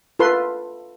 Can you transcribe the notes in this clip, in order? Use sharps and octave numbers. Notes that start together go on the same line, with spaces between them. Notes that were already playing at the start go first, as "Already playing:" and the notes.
F4 A4 B4 C6